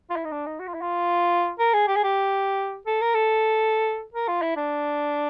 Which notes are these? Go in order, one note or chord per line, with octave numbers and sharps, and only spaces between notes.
F4
E4
D#4
D4
D#4
F#4
F4
E4
F4
A#4
G#4
G4
G#4
G4
A4
A#4
A4
A#4
F4
E4
D4